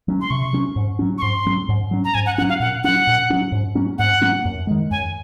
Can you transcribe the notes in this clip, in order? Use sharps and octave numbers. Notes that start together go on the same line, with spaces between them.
F#3 C#4
C6
C3 C#6
F#3 C#4
G#2
F#3 C#4
C#6
G#2 C6
F#3 C#4
G#2
F#3 C#4
A#5
G#2 G#5
F#5
F#3 C#4 F#5
F5
A#2 F#5
F#3 C#4 F#5
A#2
F#3 C#4
G#2
F#3 A#3 C#4
G#2 F#5
F#3 A#3 C#4
F#2
D#3 G#3
F#2 G#5